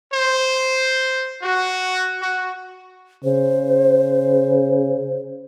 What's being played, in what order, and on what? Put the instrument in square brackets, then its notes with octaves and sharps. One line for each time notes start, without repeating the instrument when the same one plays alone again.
[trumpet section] C5
F#4
F#4
[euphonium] C#3 [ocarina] C5